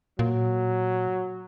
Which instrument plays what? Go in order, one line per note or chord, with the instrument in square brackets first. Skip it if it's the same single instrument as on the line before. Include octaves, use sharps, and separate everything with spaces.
[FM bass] A#2 [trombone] F#3